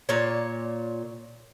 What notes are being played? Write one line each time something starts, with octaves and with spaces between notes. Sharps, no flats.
A#2 C#5